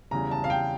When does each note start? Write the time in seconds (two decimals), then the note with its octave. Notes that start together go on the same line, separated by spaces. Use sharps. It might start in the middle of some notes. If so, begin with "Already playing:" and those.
0.11 E2 C#3 G3 A#5
0.31 A5
0.44 F5
0.50 G5